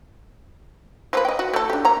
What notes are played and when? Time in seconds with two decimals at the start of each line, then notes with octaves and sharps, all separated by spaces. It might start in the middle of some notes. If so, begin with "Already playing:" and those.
1.13 F3 A#3 B4
1.25 D#5 G5
1.39 F#4
1.53 A3 A4
1.70 D4 G4
1.85 A#3 A#5